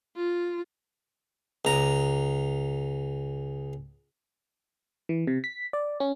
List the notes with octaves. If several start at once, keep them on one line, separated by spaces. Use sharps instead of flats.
F4
C#2 A#5
E3
C3
B6
D5
C#4